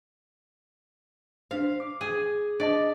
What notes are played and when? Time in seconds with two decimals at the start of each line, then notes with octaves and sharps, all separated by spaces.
1.51 D4 C5 F5
1.80 D6
2.01 G#4
2.60 D4 D5 D#5 A5